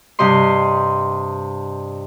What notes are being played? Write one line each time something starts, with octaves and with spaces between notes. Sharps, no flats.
G2 C3 G4 D#5 C6